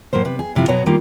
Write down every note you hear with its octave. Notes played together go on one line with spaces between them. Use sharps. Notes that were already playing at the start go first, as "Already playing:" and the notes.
A2 F#3 A#3 C5
C3 B4
G#4
G2 C3 F3 E4 F4
B2 F#3 B3 F#4 C#5 A#5
D#3 G3 A#3 D#4 F4